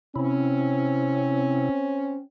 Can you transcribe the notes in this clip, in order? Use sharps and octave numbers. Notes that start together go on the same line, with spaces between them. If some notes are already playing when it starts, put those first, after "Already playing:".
C3 C4 C#4 E4